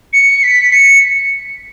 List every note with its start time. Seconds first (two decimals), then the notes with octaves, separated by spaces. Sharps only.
0.13 C#7
0.43 B6
0.72 C#7